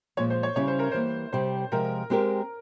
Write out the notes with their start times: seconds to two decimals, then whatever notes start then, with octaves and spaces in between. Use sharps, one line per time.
0.17 A#2 F3 G#3 C#5
0.30 C5
0.43 C#5
0.56 C#3 G3 C#4 E4 C#5
0.68 C5
0.79 A#4
0.92 E3 G3 A#3 C5
1.33 C3 G3 C4 C5
1.72 C3 F3 G#3 A#4
2.10 G#3 C4 G4 A#4